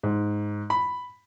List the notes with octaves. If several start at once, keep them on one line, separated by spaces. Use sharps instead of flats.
G#2
B5